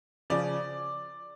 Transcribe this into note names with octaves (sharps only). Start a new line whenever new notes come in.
C#3 F3 D5